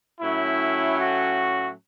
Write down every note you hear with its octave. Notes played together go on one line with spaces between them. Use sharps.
A2 F#3 A3 C#4 E4
F#4